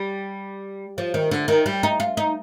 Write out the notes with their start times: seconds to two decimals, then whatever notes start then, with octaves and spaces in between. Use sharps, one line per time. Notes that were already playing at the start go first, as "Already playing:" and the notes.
Already playing: G3
0.98 F3
1.14 D#3
1.31 D3
1.48 D#3
1.66 G3
1.83 D#4
2.00 F4
2.17 D#4